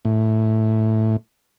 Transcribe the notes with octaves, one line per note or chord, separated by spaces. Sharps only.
A2